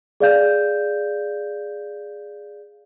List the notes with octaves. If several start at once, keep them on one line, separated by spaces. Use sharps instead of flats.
G#4 D5 F5 G6